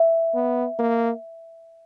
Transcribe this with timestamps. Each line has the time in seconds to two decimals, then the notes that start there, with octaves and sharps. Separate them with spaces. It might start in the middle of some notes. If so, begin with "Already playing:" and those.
Already playing: E5
0.34 B3
0.79 A#3